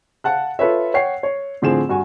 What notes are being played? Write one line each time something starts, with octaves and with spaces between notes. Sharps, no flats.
F5 F#5 A5 F#6
F4 A4 B4 C#5 E5
C#5 F#5 G5 C7
C#5
A2 D3 F3 C4 G#4 E7
G2 F#4 G#5